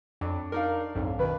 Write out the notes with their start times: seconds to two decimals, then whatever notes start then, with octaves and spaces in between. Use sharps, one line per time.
0.21 F2 D4 C#5
0.52 D#4 A#4 D5 F5
0.95 B1 F2 G#2
1.19 B2 D#3 B4